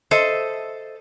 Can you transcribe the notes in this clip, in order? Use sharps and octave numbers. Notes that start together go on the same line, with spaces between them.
A4 C5 D#5 E5